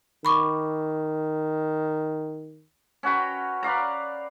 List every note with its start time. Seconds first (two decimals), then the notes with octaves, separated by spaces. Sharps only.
0.25 D#3 B5 C#6 D6
3.03 C#4 F#4 B4 G5
3.63 B4 D5 F5 A#5